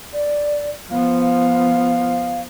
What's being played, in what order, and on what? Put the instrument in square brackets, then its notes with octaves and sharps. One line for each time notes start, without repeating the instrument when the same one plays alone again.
[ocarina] D5
[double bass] F3 B3 [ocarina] F5
[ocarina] F5